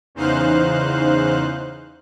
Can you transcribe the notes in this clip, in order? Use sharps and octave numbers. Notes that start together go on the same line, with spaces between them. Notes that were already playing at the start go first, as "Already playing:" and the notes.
E2 C#3 D#4 C5 F5 F#6